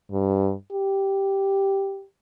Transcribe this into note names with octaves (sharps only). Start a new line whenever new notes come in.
G2
G4